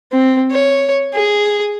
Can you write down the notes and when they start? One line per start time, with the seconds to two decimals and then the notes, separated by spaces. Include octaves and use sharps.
0.12 C4
0.51 C#5
1.14 G#4